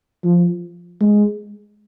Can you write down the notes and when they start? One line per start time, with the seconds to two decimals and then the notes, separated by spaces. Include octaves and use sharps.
0.24 F3
1.01 G#3